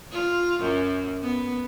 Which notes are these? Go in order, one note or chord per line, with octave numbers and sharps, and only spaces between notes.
F4
F#2
B3